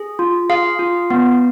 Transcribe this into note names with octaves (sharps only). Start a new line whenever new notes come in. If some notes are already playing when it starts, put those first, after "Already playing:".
Already playing: G#4
F4
G#4 F5
F4
B3